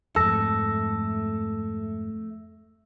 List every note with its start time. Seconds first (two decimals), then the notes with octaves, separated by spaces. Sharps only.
0.16 F2 G#2 A3 A4 E6 A#6